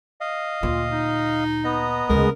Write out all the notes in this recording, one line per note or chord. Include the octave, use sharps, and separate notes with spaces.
D#5 F5
D2 A#2 F4
D#4
B3 D#5 A#5
D2 C#3 G#3 A#4